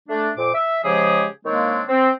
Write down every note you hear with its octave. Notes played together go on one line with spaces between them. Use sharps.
A3 D4
F2 A#2 C5 D6
E5
C#3 F3 G#3 G4 G#4
D#3 G#3 A#3 C4 D4 C#5
C4